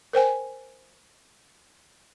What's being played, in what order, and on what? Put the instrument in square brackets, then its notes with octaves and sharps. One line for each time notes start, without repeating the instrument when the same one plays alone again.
[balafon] A#4 C5 G5 G#5